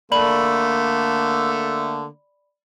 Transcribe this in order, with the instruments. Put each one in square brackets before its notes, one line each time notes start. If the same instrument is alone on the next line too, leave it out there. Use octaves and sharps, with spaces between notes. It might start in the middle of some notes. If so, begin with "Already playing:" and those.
[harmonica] D3 A3 [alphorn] A#3 [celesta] D5 B5 F#7